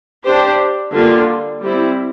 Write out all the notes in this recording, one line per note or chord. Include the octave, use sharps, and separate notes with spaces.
D4 G4 C5
D3 G3 A#3 F4
G3 C4 E4